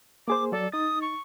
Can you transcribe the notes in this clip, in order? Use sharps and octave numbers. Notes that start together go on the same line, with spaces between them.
A#3 G#4 C5 D6
F#3 A4 D5
D#4 D#6 A6
C#6